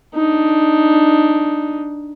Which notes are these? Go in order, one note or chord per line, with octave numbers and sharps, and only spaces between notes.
D4 D#4